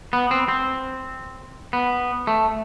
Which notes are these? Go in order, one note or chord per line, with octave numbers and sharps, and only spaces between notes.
B3
C4
C4
B3
A3